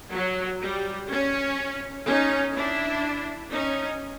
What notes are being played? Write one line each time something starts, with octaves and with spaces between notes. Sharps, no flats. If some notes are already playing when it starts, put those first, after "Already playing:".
F#3
G3
C#4
C#4 D#4
D4 E4
C#4 D#4